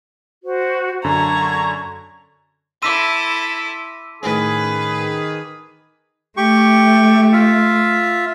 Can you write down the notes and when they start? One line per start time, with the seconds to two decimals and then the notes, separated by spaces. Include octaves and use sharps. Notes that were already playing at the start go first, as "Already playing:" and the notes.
0.44 F#4 C5
1.04 F#2 D3 A5 A#5 C#6 G#6
2.82 E4 A4 C6 D6 E6 A#6 B6 D#7
4.23 A2 D#3 C#4 G#4 B4
6.37 A3 G4 C#6
7.33 F4 E5